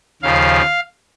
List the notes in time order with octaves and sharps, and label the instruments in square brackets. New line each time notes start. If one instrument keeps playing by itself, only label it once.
[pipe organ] D#2 C#3 F3 F5